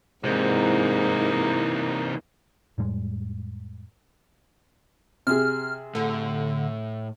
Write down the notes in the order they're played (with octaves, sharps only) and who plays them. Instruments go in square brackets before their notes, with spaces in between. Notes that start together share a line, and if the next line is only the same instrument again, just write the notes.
[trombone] G#2 [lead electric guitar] C3 E3 [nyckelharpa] A#3 D#4 [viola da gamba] C4 E4
[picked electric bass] F2 A2 G3 G#3
[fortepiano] C3 G#4 [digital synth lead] F6
[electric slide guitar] A2 [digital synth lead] D3